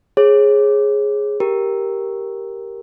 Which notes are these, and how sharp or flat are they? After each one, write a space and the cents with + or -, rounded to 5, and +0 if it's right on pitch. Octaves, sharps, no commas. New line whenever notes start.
G#4 +0 C#5 -30
G4 +0 A#4 +0